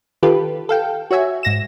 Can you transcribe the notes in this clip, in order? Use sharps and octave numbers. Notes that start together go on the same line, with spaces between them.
D#3 F4 G4 A4 B4
A4 F5 G5
F#4 C#5 E5 G#5
G#2 A#6 E7